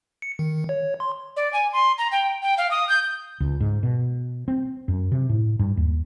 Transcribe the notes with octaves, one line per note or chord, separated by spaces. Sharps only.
C#7
D#3
C#5
C6
D5
G#5
C6
A#5
G5
G5
F5
D#6
G6
C#2
G#2
B2
C4
F#2
C3
A2
G2
D#2